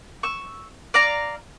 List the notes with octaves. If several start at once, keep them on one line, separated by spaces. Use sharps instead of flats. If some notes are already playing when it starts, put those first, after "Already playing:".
C#6 E6
D5 F5 A#5